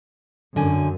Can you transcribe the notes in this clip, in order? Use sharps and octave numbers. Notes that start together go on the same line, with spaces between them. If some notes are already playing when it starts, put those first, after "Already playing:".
F#2 D3 G#5